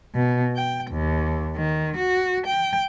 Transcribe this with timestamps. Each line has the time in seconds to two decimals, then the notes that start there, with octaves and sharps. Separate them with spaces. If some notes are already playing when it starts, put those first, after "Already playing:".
0.14 B2
0.56 G5
0.91 D#2
1.56 D#3
1.96 F#4
2.46 G5